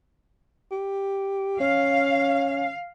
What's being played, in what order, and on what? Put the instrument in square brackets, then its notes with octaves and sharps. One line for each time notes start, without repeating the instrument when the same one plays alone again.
[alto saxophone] G4
[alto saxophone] C#4 [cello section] F5